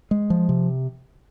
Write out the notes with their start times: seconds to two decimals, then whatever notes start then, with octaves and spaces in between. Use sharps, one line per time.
0.11 G#3
0.30 F3
0.49 C3